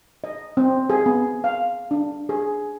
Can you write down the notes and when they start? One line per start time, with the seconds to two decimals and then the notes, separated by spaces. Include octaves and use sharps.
0.24 D#5
0.57 C4
0.90 G#4
1.06 B3
1.44 F5
1.91 D4
2.29 G#4